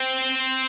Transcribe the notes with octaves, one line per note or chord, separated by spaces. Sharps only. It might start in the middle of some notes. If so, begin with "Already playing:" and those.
Already playing: C4